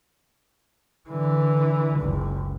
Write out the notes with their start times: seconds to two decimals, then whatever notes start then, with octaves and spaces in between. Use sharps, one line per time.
1.09 D3 E3
1.99 F#1 C#2